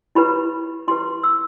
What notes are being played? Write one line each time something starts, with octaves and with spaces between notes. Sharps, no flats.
E4 G4 B4 B5
E4 G4 B4 C6
E6